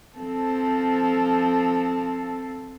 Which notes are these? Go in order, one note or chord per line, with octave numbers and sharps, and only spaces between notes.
F3 C4 A4